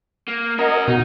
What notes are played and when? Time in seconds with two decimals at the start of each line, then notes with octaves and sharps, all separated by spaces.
0.28 A#3
0.59 C#4 F#4 A#4 D#5
0.88 B2 D#4 F#4